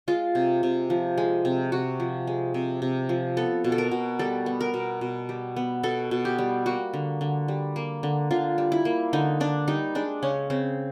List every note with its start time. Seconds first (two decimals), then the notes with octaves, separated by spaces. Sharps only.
0.08 G#3 F4
0.35 C3
0.63 C3
0.90 F3
1.18 G#3
1.45 C3
1.72 C3 F#4
2.00 F3
2.27 G#3
2.54 C3
2.82 C3
3.09 F3
3.37 B3 A4
3.64 B2
3.72 A4
3.78 A#4
3.91 B2
4.19 G3 A4
4.46 B3
4.61 A#4
4.74 B2
5.01 B2
5.29 G3
5.56 B3
5.83 B2 A4
6.11 B2
6.25 G4
6.38 G3
6.66 A#3 F#4
6.94 D3
7.21 D3
7.48 G3
7.76 A#3
8.03 D3
8.31 D3 F4
8.58 G3
8.72 E4
8.85 A#3
9.13 D3 D#4
9.40 D3 D4
9.68 G3 D#4
9.95 G#3 D4
10.23 C#3 C#4
10.50 C#3 C4